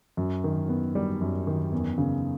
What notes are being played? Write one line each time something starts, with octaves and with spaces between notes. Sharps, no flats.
F#2
D#3
B3
G3
F#2
D#3
E2
C#3